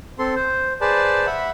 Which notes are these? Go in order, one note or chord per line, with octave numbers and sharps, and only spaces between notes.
C4 A4 C6
C5
G#4 B4 C5 D5 A5
E5 F#5 B5